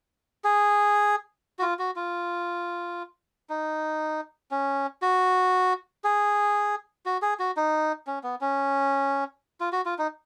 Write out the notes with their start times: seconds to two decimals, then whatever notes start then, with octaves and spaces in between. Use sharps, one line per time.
0.44 G#4
1.59 F#4
1.62 F4
1.79 F#4
1.96 F4
3.50 D#4
4.51 C#4
5.02 F#4
6.04 G#4
7.06 F#4
7.22 G#4
7.39 F#4
7.57 D#4
8.07 C#4
8.23 B3
8.41 C#4
9.60 F4
9.72 F#4
9.85 F4
9.98 D#4